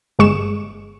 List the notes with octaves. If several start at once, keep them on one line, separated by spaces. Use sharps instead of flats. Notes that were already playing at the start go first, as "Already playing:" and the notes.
G1 G#3 C#6 E7